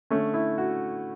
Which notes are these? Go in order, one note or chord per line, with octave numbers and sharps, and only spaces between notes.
D3 A3 C#4
E4
F#4